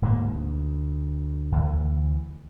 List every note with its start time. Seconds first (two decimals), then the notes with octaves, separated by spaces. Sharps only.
0.02 D1 G#2 B2 A#3
0.31 D2
1.52 D2 E3